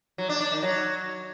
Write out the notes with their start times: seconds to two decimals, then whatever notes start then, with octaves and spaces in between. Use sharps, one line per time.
0.18 F#3
0.29 D4
0.41 D4
0.52 D#3
0.63 F#3